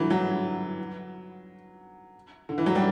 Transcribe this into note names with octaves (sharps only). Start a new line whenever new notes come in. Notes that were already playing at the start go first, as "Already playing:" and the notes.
Already playing: D3 E3 F#3 G3
F#3
D3
E3
F#3
G3